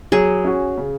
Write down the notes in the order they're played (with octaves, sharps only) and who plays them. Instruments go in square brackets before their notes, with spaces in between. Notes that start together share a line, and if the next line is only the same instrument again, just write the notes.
[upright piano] F#3 [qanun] G#4
[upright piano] C#4 F#4
C#3